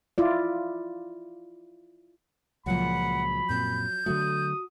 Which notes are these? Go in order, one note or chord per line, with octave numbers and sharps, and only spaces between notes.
E4 F4 D5
C#2 A#2 F3 F#3 F#5 B5
F#2 A#2 C4 G6
D3 F#3 A3 F#4 D#6